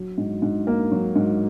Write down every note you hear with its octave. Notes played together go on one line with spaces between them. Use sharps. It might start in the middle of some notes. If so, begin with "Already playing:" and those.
Already playing: F#3
G#2
G#2
A#3
F#3
G#2